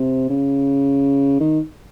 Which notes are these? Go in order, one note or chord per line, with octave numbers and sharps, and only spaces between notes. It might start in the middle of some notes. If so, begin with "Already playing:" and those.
Already playing: C3
C#3
D#3